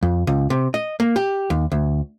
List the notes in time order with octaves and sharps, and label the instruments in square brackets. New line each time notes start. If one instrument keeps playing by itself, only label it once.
[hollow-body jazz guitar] F2
C#2
C3
D#5
A#3
G4
D#2
D2